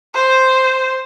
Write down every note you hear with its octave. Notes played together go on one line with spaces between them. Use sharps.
C5